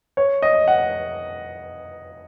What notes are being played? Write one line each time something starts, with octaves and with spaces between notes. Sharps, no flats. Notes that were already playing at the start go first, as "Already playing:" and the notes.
C#5
D#5
F#5